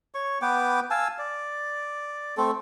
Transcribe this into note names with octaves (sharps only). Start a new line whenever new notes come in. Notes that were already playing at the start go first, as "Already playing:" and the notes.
C#5 C#6
B3 B4 G5 D6
F5 G#5 A5 E6
D5
A3 C4 A4